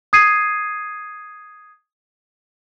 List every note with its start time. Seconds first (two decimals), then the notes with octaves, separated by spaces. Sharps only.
0.13 D#6 G#6 C7 D#7